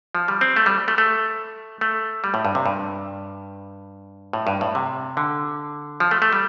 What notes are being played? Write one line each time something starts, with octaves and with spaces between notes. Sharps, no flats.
F3
G3
C4
A3
G3
A3
A3
A3
G3
A2
G2
C3
G2
A2
G2
A2
C3
D3
F3
A3
A3
G3